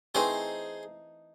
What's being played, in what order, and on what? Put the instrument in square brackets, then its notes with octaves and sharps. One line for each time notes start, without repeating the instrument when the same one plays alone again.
[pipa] E3 A3 C4 D#4 [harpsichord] G#4 C5